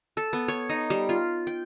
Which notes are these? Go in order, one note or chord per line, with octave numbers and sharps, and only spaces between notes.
A4
B3
C#5
D#4
G3
F4
G5